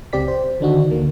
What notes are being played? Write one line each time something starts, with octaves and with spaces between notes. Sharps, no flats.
C#2 C4 G4 D5 B6
C5
D3 D#3 D4 D#4 F#4
D2 D3 A#3